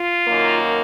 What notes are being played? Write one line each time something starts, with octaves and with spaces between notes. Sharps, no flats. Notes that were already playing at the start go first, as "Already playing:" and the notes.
Already playing: F4
F#2 D#3 A#3